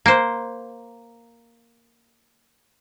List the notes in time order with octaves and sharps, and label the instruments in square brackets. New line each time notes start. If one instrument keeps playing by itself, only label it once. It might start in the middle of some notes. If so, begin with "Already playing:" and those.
[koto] A#3 C5